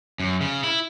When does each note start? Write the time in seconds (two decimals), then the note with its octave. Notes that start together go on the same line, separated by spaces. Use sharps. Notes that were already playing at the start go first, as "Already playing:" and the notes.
0.20 F#2
0.41 C#3
0.64 E4